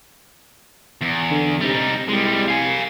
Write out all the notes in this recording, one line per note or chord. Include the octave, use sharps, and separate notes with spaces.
E2
D3
C3 G3 D#4
C2 G3 G#3
F5 G#5